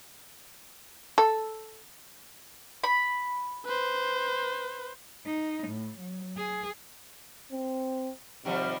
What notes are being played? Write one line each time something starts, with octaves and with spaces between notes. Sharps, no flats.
A4
B5
B4 C5
D#4
A2
F#3
G#4
C4
C3 D#3 F3 G3